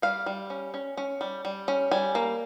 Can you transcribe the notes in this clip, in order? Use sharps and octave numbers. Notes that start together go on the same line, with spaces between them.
G3 F5
G3
C#4
C#4
C#4
G3
G3
C#4
G3 G#5
A#3